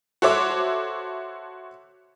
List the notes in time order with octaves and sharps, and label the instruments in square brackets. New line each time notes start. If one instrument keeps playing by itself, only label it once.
[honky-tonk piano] F#4 A4 C5 C#5 E5 D6